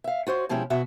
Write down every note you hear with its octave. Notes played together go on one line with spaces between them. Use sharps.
E5 F5
F4 F#4 C5 C#5
B2 F3 G#3 C#4 E4 G4
B2 F#4 E5